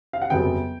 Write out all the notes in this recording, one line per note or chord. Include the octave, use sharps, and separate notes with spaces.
F5
F#5
G1 F2 C#3 F#3 B3 G5